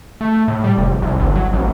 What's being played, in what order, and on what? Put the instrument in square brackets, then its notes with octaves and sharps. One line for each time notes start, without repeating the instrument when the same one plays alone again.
[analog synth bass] A3
A2
G3
F1
C2
G1
F#3
A1